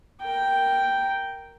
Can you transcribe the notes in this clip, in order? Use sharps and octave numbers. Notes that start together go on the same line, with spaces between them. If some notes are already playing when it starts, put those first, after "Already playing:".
A#4 G5